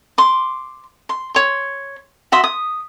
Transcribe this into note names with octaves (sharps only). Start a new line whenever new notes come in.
C6 D6
C6
C#5 C6
F#4 E5 C6 D#6
D#6